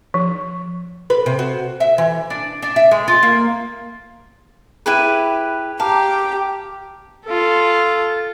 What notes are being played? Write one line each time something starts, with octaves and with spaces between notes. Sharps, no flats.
F3
B4
C3
F#4
E5
E3
D4
D4
E5
G#3
F4
A#3
E4 G4 G#4 B4 F#6 D#7
G4 F5 A5 A#5 D6
F4 A4